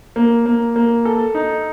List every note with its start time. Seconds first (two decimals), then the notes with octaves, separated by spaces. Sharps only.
0.16 A#3
0.46 A#3
0.76 A#3
1.05 A4
1.35 D#4